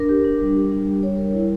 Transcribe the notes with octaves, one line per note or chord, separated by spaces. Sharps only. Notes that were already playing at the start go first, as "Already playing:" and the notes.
Already playing: D4 A#4
G4
D4
G3
G4
D4
G3
C#5
A#4
E4